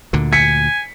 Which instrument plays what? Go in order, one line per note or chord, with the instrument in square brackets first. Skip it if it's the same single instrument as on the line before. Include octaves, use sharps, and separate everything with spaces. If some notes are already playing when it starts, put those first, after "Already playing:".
[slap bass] D2 A#2 D3
[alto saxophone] G#5 [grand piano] B6 C#7